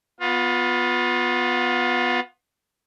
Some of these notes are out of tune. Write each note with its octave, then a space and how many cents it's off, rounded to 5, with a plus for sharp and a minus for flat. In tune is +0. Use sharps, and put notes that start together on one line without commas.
B3 +0 F4 +25